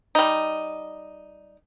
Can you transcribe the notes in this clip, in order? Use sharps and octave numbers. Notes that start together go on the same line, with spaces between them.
G3 D#4